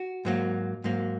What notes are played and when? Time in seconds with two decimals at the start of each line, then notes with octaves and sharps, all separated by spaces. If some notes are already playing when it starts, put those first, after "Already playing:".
Already playing: F#4
0.25 G#2 F#3 A#3
0.84 G#2 F#3 A#3